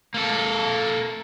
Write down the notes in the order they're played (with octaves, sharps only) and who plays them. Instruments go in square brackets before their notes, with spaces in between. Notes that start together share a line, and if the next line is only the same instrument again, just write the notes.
[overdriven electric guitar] A#3 A4